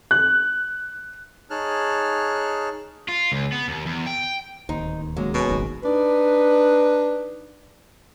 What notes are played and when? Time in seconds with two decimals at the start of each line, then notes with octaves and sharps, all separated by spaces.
0.11 F#6
1.50 D#4 G#4 C#5 A5 F6 F#6
3.09 F4
3.32 C#2
3.52 B3
3.68 D#2
3.86 E2
4.07 G5
4.69 D1 D#2 D#4 C5
5.16 F#3 G#3 A#3 C#4
5.34 B2 F#3 G#5
5.49 D#1 G#1 D#3
5.83 D4 D#4 B4